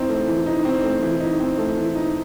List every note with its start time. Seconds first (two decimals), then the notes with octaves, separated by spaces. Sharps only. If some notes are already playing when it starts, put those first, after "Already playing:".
Already playing: E3 C4 D#4
0.09 A3
0.27 E3
0.46 D#4
0.65 C4
0.83 A3
1.02 E3
1.20 D#4
1.40 C4
1.58 A3
1.76 E3
1.95 D#4